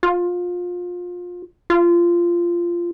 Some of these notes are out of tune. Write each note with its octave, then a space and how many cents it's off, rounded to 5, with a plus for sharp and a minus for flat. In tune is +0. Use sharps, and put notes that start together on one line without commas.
F4 +25
F4 -15